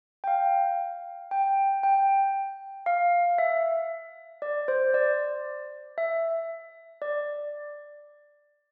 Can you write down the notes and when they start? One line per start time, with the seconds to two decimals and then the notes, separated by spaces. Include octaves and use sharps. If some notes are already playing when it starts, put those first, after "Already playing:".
0.24 G5
0.27 F5
1.31 G5
1.83 G5
2.86 F5
3.38 E5
4.42 D5
4.68 C5
4.94 D5
5.98 E5
7.02 D5